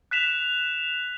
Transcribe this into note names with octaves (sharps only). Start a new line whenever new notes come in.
F#6 B6 E7 F7